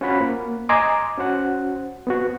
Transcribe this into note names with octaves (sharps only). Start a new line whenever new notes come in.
C#4 F4 F#4 C5 F#5 B5
A#3
D#5 G#5 A#5 C6 D6
C#4 F#4 C5 F#5
B3 C4 F#4